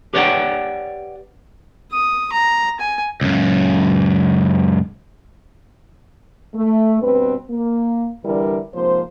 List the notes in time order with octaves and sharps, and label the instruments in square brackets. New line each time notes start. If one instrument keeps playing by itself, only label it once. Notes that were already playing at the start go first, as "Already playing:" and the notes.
[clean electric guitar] G4 B4 C#5 D5 F#5 G5
[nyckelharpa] D#6
A#5
G#5
[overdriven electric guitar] C#2 F#2
[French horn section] A3
G2 B2 C4 B4
A#3
D3 E3 G3 D4 E4 A#4
G#2 C3 F3 A#3 C5